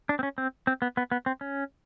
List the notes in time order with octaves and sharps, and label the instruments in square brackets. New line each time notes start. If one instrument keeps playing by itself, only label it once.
[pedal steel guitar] D4
C4
C#4
C4
C4
B3
B3
B3
C4
C#4